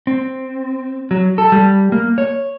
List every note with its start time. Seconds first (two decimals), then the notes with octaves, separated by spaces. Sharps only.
0.07 C4
1.11 F#3
1.38 A4
1.52 G3
1.92 A#3
2.18 C#5